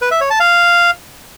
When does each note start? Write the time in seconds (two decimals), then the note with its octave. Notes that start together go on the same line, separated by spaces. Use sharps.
0.02 B4
0.11 E5
0.21 C#5
0.30 A5
0.40 F5